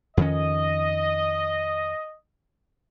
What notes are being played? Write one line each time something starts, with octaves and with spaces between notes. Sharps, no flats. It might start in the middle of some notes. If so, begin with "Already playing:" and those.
F2 D#3 C#4 D#5